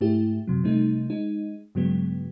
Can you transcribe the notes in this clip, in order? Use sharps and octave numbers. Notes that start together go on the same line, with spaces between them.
G#2 A3 E4 G4
F#2 C3 F#3
C3 G3 A3 D#4
G#3 D#4
G2 C#3 F#3 G#3 B3